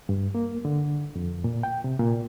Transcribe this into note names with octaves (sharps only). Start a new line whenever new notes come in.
G2
A#3
D3
F2
A#2
G5
C3
A#2